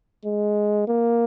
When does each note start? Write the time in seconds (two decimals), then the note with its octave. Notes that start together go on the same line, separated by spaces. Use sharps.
0.25 G#3
0.87 A#3